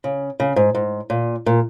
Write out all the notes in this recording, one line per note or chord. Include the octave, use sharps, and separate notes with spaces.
C#3
C#3
G#2
G#2
A#2
A#2